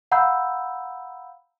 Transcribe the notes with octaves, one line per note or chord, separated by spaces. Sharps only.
F5 F#5 A#5 B5 E6 G6